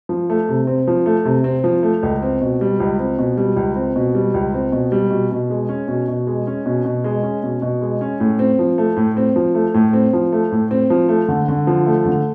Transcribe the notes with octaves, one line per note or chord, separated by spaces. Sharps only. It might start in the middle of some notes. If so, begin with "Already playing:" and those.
F3
A3
C3
C4
F3
A3
C3
C4
F3
A3
C#2
C4
B2
G3
C#2
C4
B2
G3
C#2
C4
B2
G3
C#2
C4
B2
G3
B2
B2
G#3
C#4
B2
B2
G#3
C#4
B2
B2
G#3
C#4
B2
B2
G#3
C#4
A2
C4
F3
A3
A2
C4
F3
A3
A2
C4
F3
A3
A2
C4
F3
A3
D3
D3
F3
A3
D3